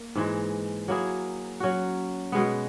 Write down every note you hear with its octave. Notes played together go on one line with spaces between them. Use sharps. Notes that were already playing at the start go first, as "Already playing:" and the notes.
Already playing: A#3
G#2 E3 G#3
F#3 A#3 E4 G#4
F#3 C#4 F#4
B2 G#3 B3